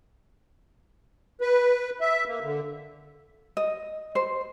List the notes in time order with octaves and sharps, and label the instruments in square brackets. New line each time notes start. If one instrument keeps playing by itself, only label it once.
[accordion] B4
E5
A#3
D3
[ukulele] D#5
C5